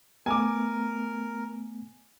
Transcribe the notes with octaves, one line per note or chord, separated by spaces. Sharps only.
A3 B3 A#4 G#5 D6